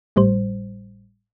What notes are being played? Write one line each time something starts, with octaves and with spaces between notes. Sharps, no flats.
G#1 A2 G3 C5